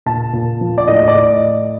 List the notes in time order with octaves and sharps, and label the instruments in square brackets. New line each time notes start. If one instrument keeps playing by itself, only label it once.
[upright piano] A#2 A5
A#2
F3
D5
A2 D#5
D#5
D5
A2
D#5